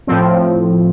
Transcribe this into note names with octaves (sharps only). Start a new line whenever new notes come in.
A2 F3 C4